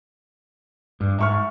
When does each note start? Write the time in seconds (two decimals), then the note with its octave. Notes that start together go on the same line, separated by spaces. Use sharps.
1.01 G2
1.19 G#2 E5 C#6 F6